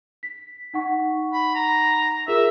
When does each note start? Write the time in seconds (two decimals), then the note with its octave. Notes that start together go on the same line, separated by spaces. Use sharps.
0.23 B6
0.74 D#4 F#5 C#6
1.33 B5
1.55 A#5
2.28 F4 G#4 A#4 E5